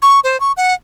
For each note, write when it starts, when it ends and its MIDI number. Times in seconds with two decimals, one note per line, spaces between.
0.02 0.20 85
0.24 0.40 72
0.40 0.52 85
0.57 0.74 78